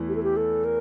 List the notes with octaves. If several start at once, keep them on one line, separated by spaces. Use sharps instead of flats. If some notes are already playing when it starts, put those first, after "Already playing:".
Already playing: E2 E3 A3 E4
G4
A4
G4
A4
A#4